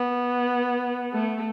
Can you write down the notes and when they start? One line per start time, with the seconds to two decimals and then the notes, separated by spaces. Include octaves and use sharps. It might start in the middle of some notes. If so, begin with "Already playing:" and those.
Already playing: B3
1.13 A3